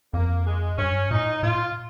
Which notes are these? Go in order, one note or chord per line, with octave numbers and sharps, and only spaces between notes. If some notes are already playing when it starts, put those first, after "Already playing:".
F2 A#3
G#3
G2 C#4
A#2 D#4
A#2 F4